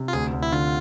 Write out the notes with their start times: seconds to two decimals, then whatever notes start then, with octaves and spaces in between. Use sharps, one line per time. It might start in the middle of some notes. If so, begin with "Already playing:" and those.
Already playing: C3
0.08 F4
0.13 D2 G#4
0.33 D2
0.43 E4
0.52 D3 F4